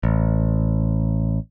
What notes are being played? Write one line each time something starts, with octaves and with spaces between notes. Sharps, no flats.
A1